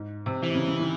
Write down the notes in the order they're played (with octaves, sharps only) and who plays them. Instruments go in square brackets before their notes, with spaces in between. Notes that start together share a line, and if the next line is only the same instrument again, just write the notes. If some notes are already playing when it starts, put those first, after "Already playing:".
Already playing: [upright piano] G#2
C3
[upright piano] C3 [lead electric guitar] E3
[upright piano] C#3
C#3
D#3